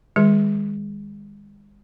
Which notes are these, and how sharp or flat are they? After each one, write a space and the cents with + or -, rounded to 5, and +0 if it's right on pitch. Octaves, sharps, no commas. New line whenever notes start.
D#3 -10 G#3 -35 G#4 +5